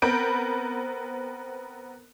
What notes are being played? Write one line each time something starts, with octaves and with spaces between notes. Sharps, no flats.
B3 C4 A#4 B5 G6 D7